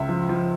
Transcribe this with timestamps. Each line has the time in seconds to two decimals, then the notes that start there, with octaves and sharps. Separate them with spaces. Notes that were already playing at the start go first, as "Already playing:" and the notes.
Already playing: C#2 E5
0.09 F3
0.29 F3